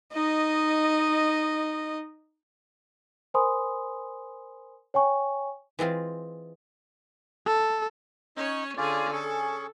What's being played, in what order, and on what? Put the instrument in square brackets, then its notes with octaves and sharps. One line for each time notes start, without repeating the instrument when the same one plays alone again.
[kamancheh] D#4 D#5
[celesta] A#4 C5 G#5 B5 C6 D#6
C#5 G5 G#5 C#6
[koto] E3 G#3 C4 F4
[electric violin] A4
[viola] C#4 C#5 [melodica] D#4
[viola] D3 G#4 [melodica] C#4 F4 D5
[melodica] C#4 G#4 C#6 [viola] A4